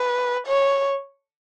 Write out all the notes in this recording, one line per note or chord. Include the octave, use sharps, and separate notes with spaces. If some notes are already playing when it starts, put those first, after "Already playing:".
Already playing: B4
C#5